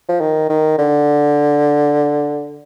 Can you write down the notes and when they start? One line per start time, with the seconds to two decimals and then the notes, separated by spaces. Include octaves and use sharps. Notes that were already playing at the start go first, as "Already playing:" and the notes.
0.09 F3
0.21 D#3
0.49 D#3
0.78 D3